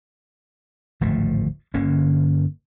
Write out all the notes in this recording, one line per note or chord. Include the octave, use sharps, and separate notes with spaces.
D1 G#1 F3 A3
G1 D3 A#3 C#4